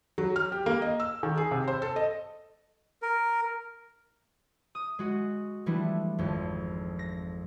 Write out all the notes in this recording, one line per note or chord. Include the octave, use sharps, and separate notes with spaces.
F#3
F6
G4
A#3
D#5
E6
D#3
G#4
C3
C5
A4
D#5
A#4
D#6
G#3 F#4
E3 F3 G3 A3 D4 E4
G#1 F2
A#6